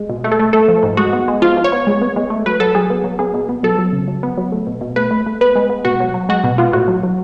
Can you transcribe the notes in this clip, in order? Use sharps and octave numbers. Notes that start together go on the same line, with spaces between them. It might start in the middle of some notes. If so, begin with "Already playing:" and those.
Already playing: G#3
B2
A3
A4
A3
A3 A4
F3
G#2
G#3 F#4
B3
G#3
F3 F4
F3
C#5
B3
G#3
B3
G#3
A3
F#3 B4
F#3 A4
F#3 G#4
B3
F#3
B3 G#4
B2
B3
F#3 A4
F#3
C#3
F#3
B3
F#3
A3
B2
B2
A3 B4
A3
A3
B3 B4
G#3
B3
B2 F#4
F#3
F#3
G#3 F#4
B2
B3 F4
A2 F#4
F#3
F#3